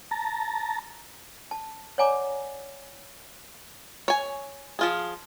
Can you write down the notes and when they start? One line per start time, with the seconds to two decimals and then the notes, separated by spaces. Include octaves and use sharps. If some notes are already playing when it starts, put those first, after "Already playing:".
0.11 A5 A#5
1.51 A5
1.98 C#5 D5 F#5 G#5 A#5 D6
4.08 C#5 G#5
4.79 F3 F4 G#4